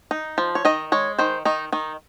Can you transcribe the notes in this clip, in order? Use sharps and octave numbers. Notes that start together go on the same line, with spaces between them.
D#4
F3
C#5
D#3 D#5
G#3 C#5
D#3 C5
D#3 D#4
D#3 D#4